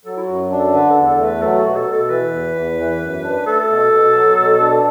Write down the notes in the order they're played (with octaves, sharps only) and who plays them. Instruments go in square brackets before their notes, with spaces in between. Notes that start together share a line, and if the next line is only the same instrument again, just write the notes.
[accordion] F#3 [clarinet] A4
[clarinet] E4
F#4
[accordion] F#2
D4
[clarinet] A4
[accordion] D3 [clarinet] B4
[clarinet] A4
[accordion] E2
[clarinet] A4
[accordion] A3
[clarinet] B4
[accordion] F#3 [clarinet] A4
[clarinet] F#4
[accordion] B2
[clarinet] A4
[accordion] B2
[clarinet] A4
[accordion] E3 [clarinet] B4
[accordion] E2
E2
E3
F#2
D4
[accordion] A3 [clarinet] A4
[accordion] B2
B2
F#3
B2
D4